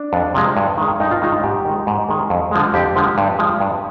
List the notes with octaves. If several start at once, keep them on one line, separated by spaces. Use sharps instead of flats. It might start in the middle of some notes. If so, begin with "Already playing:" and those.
Already playing: D4
F2
C3 F3 G#3
G2
D#3 G#3
G2 D#4
F4
D#3 G#3 D#4
G#2 G4
D#3 G#3
G#2
D#3 G#3
F2
D3 F3 G#3
F2 G4
D3 F3 G#3
G2
F3 G#3
G2